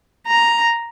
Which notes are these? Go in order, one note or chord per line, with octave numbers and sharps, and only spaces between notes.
A#5